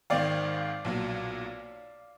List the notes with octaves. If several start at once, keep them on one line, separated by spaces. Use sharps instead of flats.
G#1 G#2 D#3 D5 F5
B1 A#2 F#3